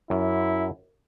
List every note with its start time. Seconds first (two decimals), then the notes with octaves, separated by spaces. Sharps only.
0.10 F#2 E4